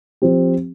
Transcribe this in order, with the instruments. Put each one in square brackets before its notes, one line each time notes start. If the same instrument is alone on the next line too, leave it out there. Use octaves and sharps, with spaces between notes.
[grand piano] F3 C4 G4